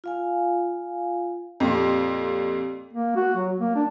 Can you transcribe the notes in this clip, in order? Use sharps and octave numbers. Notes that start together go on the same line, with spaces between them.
F4 F5 G#5
F2 A#2 G4 A4
A#3
F#4
F#3
A#3
D4